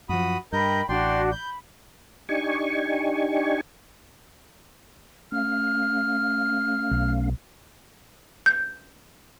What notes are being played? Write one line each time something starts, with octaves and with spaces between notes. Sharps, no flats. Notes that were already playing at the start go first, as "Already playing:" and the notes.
F#2 F3 F#4 B5 D#6
G2 A#4 D#5 G5 B5 G6
A1 D4 F#4 D5 G5 C6
B5 G6
D4 D#4 G4 G#5 C#6
A3 C#4 F5 F6
B1
G6